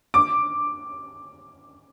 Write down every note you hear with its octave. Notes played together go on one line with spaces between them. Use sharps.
D6